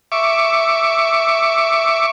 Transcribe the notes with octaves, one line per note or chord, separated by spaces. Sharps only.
E5 C#6 D6